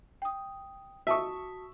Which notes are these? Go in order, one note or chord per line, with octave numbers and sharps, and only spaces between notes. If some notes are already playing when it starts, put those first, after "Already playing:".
G5 D#6
F#4 E5 A5 C#6 D#6